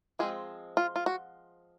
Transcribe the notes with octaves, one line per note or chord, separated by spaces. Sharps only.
F3 G#3 C4 G#4
F4
F4
F#4